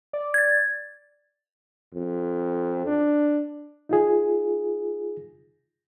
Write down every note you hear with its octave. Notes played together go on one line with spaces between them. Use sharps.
D5
G#6 A6
F2
D4
D#4 F4 G#4